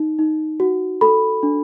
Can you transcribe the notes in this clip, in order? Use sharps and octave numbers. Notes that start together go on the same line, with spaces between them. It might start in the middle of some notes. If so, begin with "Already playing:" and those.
Already playing: D#4
D#4
F#4
A4 B5
D4